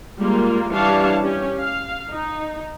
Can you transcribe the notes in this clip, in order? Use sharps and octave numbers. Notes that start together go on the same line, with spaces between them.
G3 G#3 A#3 F4
E3 G3 D4 C#5 F5 A5
C#4 G4
F5
D#4